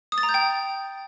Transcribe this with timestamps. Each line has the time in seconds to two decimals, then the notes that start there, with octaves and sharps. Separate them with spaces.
0.12 D#6
0.18 A6
0.23 A#5
0.29 G6
0.34 G5